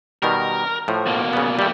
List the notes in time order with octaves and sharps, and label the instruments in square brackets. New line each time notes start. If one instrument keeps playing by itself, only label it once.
[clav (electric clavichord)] B2 D#3 G3 [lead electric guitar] A#4
[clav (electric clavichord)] A2 F3
[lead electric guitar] B2 A#3
[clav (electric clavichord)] C#3 B3
[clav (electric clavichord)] G3 A3 [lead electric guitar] A#3 G4